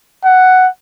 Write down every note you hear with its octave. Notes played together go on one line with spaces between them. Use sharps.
F#5